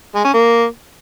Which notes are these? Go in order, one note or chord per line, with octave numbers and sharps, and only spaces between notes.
G#3
C#4
A#3